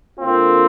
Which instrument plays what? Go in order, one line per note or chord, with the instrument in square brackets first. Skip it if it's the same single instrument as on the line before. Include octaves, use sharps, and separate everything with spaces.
[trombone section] D3 A#3 F4 [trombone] C4